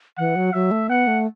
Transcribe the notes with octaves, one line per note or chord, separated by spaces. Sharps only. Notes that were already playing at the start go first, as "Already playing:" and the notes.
E3 F#5
F#3
F#3 E5
A3
B3 F#5
A3